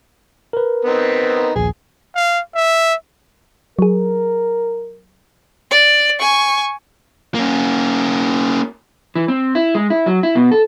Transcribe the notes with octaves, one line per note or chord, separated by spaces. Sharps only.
A#4 B4
B3 C4 D#4
A#1 D#2 G#4
F5
E5
F#3 G#4 A#4
D5
G#5 C#6
A#3 C#4
E3
C4
E4
G#3
E4
F#3
E4
B2
A4